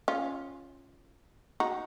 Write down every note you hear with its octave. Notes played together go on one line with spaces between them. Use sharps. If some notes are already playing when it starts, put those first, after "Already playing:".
C#4 F4
D#4 F#4